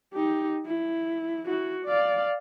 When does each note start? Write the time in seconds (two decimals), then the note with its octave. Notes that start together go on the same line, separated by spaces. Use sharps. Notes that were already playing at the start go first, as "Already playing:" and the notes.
0.14 D#4 G4
0.66 E4
1.46 E4 F#4
1.85 D5 F5